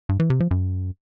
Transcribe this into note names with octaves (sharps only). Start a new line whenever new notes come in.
G2
E3
C3
F3
F#2